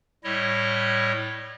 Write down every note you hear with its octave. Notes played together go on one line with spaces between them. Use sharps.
A2 G3 E4 C#5 D#5